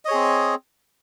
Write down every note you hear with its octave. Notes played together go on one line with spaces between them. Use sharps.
C4 G#4 C#5 D#5